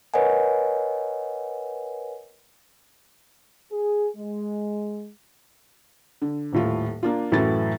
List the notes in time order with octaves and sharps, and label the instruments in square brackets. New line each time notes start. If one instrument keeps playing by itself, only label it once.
[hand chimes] A#4 B4 C#5 D#5 F#5 G#5
[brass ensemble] G#4
G#3
[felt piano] D3
D#1 A2 F4
A#3 D4 F4
F#2 A2 E3 F#3 A3 A6